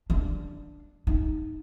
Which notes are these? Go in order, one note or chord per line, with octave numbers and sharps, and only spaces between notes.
D4
D#4